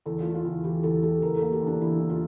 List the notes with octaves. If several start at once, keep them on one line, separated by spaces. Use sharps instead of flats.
E2 A4
A3 F4
F4
E2
E3 G4
E2 A4
A3 G4
E2 A#4
A#3 A4
G4
E2 D4
E3 E4
E2
F4